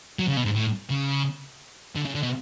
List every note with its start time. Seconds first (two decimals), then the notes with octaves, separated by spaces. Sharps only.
0.19 F#3
0.28 C#3
0.37 B2
0.45 G#2
0.55 A2
0.90 C#3
1.96 D3
2.05 C#3
2.15 D3
2.23 B2